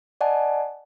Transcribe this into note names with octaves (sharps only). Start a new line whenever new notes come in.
D5 D#5 F#5 G#5 A5